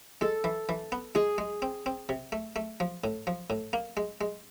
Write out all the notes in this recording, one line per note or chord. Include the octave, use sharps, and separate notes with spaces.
G#3 A4
E3
E3
B3
G#3 G#4
G#3
C4
C4
C3
A3
A3
F3
A2
F3
A2
A#3
G#3
G#3